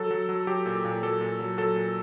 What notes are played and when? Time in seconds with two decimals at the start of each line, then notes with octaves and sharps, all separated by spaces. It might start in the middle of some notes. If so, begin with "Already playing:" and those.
Already playing: F#3 A4
0.11 F#3
0.29 F#3
0.47 F#3 G4
0.66 A#2
0.85 A#2
1.03 F#3 A4
1.21 A#2
1.39 F#3
1.58 F#3 A4
1.76 A#2